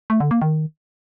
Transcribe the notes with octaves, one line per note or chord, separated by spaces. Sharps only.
A3
D3
A#3
D#3